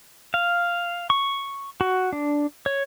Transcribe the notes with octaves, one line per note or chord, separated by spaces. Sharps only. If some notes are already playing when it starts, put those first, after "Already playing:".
F5
C#6
F#4
D4
C#5